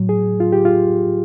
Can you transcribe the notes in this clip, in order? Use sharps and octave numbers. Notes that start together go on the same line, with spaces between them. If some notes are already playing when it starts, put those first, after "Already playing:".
Already playing: A2 F#3
G#4
F4
G4
F4